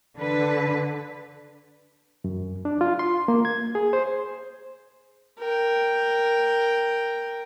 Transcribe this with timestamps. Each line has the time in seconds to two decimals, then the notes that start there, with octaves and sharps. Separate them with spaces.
0.17 D3 B4
2.24 F#2
2.65 D4
2.81 F4
2.99 C6
3.28 A#3
3.45 G#6
3.75 G#4
3.93 C5
5.39 A#4 G5